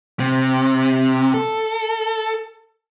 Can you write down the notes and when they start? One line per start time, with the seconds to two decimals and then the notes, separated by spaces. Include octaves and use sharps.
0.20 C3
1.34 A4